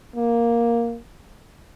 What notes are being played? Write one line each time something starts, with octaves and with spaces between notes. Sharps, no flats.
A#3